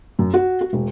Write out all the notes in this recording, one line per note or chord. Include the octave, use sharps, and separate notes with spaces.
F#2
F#4
F#4
E1